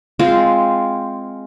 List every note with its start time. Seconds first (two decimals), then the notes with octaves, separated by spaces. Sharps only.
0.19 G#3 C4 F4 C5